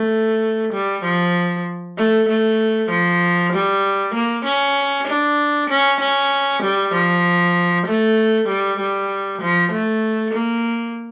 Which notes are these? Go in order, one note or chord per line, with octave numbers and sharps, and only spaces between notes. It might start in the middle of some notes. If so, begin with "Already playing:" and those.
Already playing: A3
G3
F3
A3
A3
F3
G3
A#3
C#4
D4
C#4
C#4
G3
F3
A3
G3
G3
F3
A3
A#3